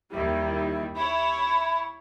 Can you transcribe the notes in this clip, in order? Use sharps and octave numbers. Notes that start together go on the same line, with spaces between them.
D#2 D#3 G3 E4
E4 C#5 B5